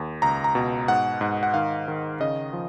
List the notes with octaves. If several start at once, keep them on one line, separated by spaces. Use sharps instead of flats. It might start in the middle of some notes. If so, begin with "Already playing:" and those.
Already playing: D#2
C#2 A#5
A#5
B2
G#2 F#5
G#2
F#5
D#3 F5
D#3
C#3 D#5
F3